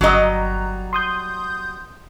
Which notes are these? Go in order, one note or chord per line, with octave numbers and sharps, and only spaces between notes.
G1 F#3 G3 D#5 A#5
C6 D#6 G6